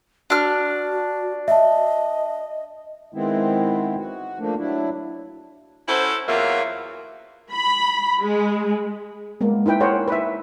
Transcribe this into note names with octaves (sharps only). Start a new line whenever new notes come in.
D4 F#4 F6
D#5 E5 A5
D#3 G#3 B3 C4 E4
F#4
F3 A3 A#3 D4
F#3 D4 E4
C#4 E4 F#4 A4 C5
E2 F#3 A#3 F4 A#4 E5
B5
G#3
G#3 A#3 B3
D#4 E4 B4 G5
G#4 A#4 C5 C#5 F#5
B4 E5